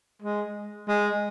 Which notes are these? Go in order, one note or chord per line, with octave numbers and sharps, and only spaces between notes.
G#3
G#3